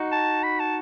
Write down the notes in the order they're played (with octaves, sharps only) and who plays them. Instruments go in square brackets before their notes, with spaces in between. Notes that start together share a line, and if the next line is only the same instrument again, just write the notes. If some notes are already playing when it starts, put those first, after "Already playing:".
Already playing: [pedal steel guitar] D#4 F#4
[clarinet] A5
B5
A5